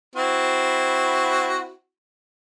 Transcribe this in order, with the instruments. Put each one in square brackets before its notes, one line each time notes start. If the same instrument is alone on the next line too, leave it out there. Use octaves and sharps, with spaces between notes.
[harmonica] C4 E4 F#4